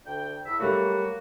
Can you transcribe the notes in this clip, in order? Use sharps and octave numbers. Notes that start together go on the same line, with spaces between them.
D2 G5
E2 E5
F#3 G3 A3 A#3 F#4